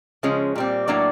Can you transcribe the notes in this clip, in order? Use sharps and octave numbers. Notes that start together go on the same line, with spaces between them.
C#3 F3 G#3 C#4
A#2 G3 C4
A2 F#3 A#3 D4 D5